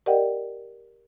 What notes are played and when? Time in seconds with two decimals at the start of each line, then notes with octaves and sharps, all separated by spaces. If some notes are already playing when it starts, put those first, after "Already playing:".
0.06 G4 A#4 D5 D#5 F#5 G5